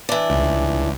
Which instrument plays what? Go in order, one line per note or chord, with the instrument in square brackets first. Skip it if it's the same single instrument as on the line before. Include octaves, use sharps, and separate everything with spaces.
[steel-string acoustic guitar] E3 D4
[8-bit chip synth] C#2